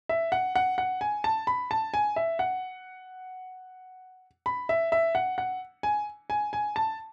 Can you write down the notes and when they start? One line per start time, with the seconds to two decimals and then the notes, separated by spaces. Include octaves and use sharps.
0.09 E5
0.32 F#5
0.56 F#5
0.78 F#5
1.01 G#5
1.24 A5
1.47 B5
1.71 A5
1.94 G#5
2.16 E5
2.39 F#5
4.46 B5
4.69 E5
4.92 E5
5.15 F#5
5.38 F#5
5.83 G#5
6.30 G#5
6.53 G#5
6.76 A5